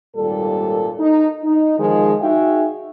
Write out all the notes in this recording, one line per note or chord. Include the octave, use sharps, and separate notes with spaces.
G#1 D#2 A#2 G3 A4
D#4
D#4
D#3 F3 G#3
D#4 F#4 G#4 E5 F5 G5